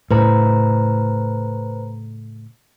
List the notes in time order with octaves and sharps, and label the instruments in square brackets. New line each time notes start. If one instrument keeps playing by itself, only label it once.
[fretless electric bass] A2 C#3 [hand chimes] B4 C5 A#5